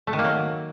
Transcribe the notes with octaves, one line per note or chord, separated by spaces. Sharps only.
A3
D#3
A#3
F#3